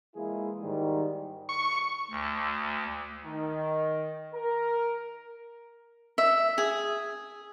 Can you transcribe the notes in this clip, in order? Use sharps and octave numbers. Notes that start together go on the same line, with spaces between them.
E3 G#3 A#3 E4 F4 G#4
G#2 D#3 G3
C#6
D2
D#3
A#4
E5
G#4